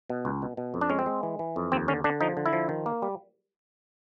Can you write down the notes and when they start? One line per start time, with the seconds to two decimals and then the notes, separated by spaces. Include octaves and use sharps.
0.10 B2
0.25 C#2
0.42 B2
0.57 B2
0.74 F2
0.81 D4
0.90 G#3 C#4
0.99 C4
1.06 G#3
1.23 E3
1.39 E3
1.56 F2
1.72 D#2 C4
1.88 D3 C#4
2.04 D3 D4
2.21 F3 D#4
2.37 D3
2.46 E4
2.53 F3
2.69 D#3
2.86 A#3
3.02 G3